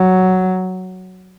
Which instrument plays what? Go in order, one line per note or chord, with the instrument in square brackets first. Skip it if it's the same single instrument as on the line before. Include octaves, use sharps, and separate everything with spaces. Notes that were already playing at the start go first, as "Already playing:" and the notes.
Already playing: [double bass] F#3